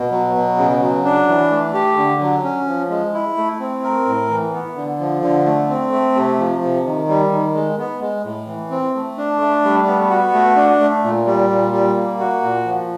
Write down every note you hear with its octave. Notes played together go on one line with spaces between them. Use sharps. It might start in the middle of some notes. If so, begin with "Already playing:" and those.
Already playing: B2
F#3
B2
C#3
F#3
D4
E3
A3
G4
D3
F#3
C#4
F3
G#3
E4
A3
C4
A#4
A2
E3
B3
D3
F3
D3
A3
C4
A3
C3
F3
C3
D#3
G3
D#3
G#3
B3
G#3
A2
E3
C4
A3
D4
A3
G3
B3
F#4
A3
D4
A3
A#2
G3
A#2
G3
A#3
F#4
A#2
F3